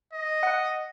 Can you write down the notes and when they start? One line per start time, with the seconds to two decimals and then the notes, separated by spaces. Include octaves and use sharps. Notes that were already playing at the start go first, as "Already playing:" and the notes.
0.13 D#5
0.43 F#5